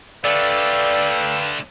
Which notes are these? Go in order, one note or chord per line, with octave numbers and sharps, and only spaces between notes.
D3 A3 A4 B4 D5 F5 G5